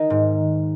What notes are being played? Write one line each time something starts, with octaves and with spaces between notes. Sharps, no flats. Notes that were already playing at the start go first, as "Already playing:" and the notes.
Already playing: D#3 D#4
G#2